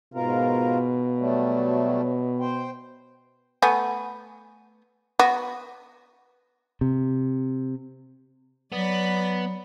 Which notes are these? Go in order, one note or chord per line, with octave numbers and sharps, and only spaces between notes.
G#2 B2 F4 A#4
F#3 G3 A3
C5 G5
A3 B3 G#5
B3 F#4
C3
F#3 B3 D5 B5